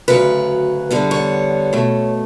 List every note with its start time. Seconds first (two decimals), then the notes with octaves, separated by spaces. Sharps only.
0.08 D2 C#3 F#3 B4
0.91 E2 D3 G3 B3
1.11 C#5
1.73 B2 A3